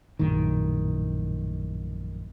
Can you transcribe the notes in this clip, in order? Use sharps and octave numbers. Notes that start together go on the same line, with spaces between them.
A#1 F#2 A2 D#3